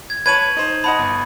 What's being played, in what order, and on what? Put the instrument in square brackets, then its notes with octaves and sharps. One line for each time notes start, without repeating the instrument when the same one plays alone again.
[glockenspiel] G#6
[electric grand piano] B4 C#5 A5 [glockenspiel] G#6 D#7 F#7
[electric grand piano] D#4 C5
[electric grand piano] D#5 F#5 A5 [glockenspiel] B5
[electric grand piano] G1